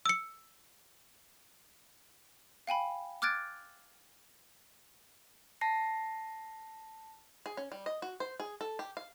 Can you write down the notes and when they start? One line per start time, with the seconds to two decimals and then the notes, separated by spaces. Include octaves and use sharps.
0.06 E6 C#7
2.67 F5 G5 G#5 B5
3.22 D6 F6 F#6 G#6 A6 D7
5.61 A5 A#6 C7
7.46 G#4
7.57 C#4
7.72 G3
7.86 D#5
8.02 F#4
8.20 C5
8.40 G#4
8.61 A4
8.79 G4
8.97 F5